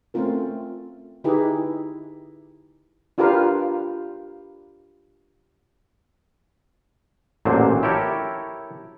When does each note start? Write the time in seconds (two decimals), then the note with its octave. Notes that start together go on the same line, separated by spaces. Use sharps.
0.14 A3 C4 C#4 F4 A#4
1.24 D3 D#4 E4 G4 G#4 B4
3.18 D4 F4 G4 A#4 B4 F5
7.45 A1 A#2 D3 F#3 C5
7.83 E4 G4 A4 A#4 C#5